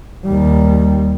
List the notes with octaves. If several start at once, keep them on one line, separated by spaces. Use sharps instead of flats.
D#2 G3